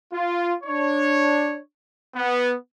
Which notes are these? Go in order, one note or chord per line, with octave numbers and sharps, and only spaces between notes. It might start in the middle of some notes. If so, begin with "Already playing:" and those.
F4
D4 C#5
B3